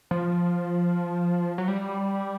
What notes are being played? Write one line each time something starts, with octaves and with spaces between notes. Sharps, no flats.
F3
F#3
G3